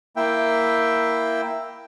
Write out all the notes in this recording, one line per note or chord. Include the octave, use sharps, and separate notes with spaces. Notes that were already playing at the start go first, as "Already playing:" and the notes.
A#3 E4 E5 G5